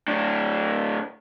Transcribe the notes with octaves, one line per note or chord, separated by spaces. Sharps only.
A2 D4